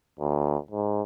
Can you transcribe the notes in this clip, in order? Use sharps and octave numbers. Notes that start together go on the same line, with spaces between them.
D2
G#2